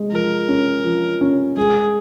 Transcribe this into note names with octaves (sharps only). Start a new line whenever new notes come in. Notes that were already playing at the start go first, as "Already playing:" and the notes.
Already playing: G#3
F3 A#4
C#4
F3
C#4
G#3 G#4